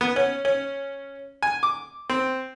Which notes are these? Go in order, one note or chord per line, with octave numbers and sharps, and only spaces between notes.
B3
C#4
C#4
G#5
D6
C4